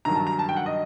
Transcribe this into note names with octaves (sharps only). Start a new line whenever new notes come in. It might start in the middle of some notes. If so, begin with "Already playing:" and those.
G2 D#3 F#3 A#5
A5
A#5
A5
G5
F#5
D#5